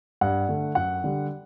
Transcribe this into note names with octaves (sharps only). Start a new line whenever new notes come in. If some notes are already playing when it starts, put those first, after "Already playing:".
G2 F#5
D3 A3
F#2 F#5
D3 G3